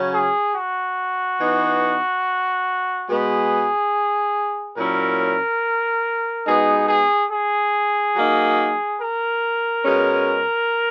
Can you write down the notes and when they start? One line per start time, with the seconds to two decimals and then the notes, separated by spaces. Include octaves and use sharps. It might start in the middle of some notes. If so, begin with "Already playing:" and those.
Already playing: C#3 F#3 C#4
0.13 G#4
0.54 F#4
1.39 E3 B3 D#4
3.08 B2 G#3 B3 G#4
4.77 A#2 F#3 C#4 E4 A#4
6.46 B2 G#3 B3 D#4 G#4
6.88 G#4
7.31 G#4
8.16 F#3 A#3 D#4
9.00 A#4
9.84 B2 G#3 C#4